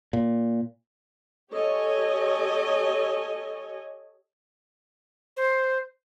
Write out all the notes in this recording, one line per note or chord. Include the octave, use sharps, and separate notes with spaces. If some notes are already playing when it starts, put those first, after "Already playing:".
A#2
G4 A4 C#5 D#5 G#5
C5